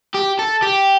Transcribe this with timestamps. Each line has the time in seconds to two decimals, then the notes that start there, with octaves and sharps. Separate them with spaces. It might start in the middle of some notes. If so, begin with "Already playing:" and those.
0.14 G4
0.39 A4
0.62 G4